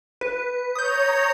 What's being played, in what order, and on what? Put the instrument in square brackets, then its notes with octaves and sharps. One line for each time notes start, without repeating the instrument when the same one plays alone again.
[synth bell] B4
[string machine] C#5 A#5 [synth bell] D#6 G6